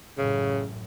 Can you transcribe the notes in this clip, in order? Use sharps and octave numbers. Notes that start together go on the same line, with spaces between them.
A1 F#2 C#3